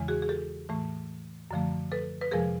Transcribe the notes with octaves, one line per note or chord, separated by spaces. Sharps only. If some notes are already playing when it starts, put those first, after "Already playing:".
Already playing: E2 C#3 E3 G#3
F#4 G#4
G#4
G4 A4
A2 E3 A3
F#2 D3 F3 A3
A4 B4
B4
F2 C3 F3 G#3 G#4 A#4